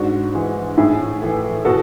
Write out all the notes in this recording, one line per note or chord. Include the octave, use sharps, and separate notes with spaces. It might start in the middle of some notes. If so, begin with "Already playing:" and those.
Already playing: G#2 D4 F#4
E3 G#3
A2 E4 G#4
E3 A3
B2 F#4 A4